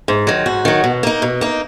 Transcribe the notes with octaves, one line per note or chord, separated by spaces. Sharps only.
G#2
D#3 F#3
G#2 F#4
D#3 F#3
B2
A#3 D#4
B2
A#3 D#4